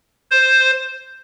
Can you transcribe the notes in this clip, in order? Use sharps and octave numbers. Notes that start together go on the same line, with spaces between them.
C5